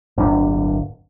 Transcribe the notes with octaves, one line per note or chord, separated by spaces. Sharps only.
D1 G1 D4